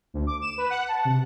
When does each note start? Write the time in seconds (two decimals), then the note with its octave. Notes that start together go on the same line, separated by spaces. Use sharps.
0.14 D2
0.27 D6
0.42 E7
0.58 B4
0.70 F#5
0.88 A5
1.05 C3